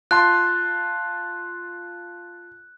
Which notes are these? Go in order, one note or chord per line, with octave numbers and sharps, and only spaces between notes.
F4 A5 C6 F#6